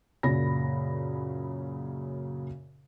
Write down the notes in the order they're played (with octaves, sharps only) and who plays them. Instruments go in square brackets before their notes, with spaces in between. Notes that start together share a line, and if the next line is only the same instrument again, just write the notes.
[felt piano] F#2 A#2 C#3 B5 A#6